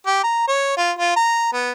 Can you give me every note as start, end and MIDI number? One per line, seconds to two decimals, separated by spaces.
0.07 0.20 67
0.24 0.43 82
0.48 0.76 73
0.77 0.91 65
0.98 1.11 65
1.16 1.51 82
1.53 1.72 59